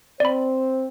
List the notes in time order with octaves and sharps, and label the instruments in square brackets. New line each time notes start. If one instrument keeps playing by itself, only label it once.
[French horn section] C4 C5 [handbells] D5 B5